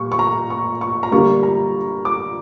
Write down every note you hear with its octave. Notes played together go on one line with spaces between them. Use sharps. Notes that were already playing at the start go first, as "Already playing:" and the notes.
Already playing: A#2 G3 C#6
C#6
A#5
C#6
C#6
A#5
D3 G3 A#3 C#6
A#5
D6